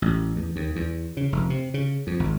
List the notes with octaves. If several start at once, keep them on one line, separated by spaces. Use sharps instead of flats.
A1
E2
D#2
E2
C#3
F1
C3
C#3
F2
G#1